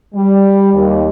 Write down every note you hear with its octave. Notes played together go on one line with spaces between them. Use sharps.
G3
D#2